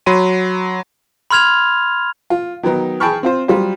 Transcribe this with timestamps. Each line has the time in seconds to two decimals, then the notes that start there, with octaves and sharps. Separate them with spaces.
0.06 F#3 B5 C6 D#7
1.31 B5 C6 F6 G#6 F7
2.30 F4
2.63 D#3 F#3 B3 D#4
3.00 G#4 G5 A5 B5 C#6 F6
3.23 C4 F4 C5
3.48 F#3 G3 F4 C5